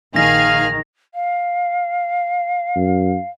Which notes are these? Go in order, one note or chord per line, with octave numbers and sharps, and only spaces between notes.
A#1 D#3 G#4 F5 F6 A#6
F5
F#2